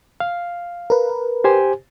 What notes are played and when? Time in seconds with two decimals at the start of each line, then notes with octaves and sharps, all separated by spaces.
0.20 F5
0.90 A#4 B4
1.44 G4 C5 G#5